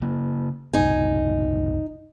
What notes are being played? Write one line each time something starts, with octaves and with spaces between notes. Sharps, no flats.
C#3 A#3
F#1 C2 D#4 G#5